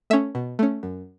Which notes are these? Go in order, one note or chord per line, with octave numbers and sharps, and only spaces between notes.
A3 C#4 E5
B2
A3 C#4
F#2